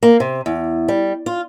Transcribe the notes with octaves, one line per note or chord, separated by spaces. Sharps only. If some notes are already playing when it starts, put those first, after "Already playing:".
A#3
C3
E2
G3
F4